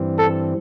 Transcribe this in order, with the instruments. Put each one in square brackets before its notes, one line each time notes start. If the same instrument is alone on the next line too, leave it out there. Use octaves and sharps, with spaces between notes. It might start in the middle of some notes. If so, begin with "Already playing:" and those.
Already playing: [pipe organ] G2 E3 G3 C4
[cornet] A4